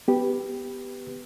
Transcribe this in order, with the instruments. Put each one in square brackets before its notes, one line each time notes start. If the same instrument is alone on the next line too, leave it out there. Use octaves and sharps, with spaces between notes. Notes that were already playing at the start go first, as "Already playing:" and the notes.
[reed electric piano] B3 G4 B4